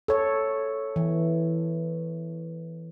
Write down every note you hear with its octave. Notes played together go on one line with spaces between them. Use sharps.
A4 C#5
E3